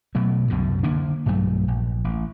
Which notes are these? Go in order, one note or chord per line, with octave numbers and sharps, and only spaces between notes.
B2 F#3 A3
C2 F#2 B2 D3
D3 A#3 D4
B1 G2 F#3 A3
A#1
A1